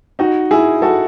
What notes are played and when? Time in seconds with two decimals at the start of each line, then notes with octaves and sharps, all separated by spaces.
0.19 D#4 F#4
0.51 E4 G#4
0.82 F#4 A4